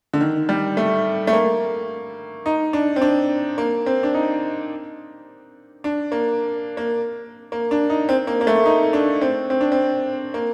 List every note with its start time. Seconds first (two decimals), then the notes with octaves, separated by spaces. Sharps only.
0.13 D3
0.21 D#3
0.49 G3
0.77 A3
1.27 A3
1.33 A#3
2.46 D#4
2.73 D4
2.96 C4
3.02 D4
3.58 A#3
3.86 C4
4.03 D4
4.14 D#4
5.84 D4
6.12 A#3
6.77 A#3
7.52 A#3
7.71 D4
7.90 D#4
8.09 C4
8.27 A#3
8.41 A#3
8.47 A3
8.66 D#4
8.93 D4
9.21 C4
9.50 C4
9.61 D4
9.72 C4
10.34 A#3